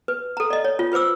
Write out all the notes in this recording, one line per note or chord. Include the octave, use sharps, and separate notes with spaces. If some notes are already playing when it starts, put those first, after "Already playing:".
B4
A4 A#5
D5 D#5
C#5
F4
F4 B4 C5 D6 E6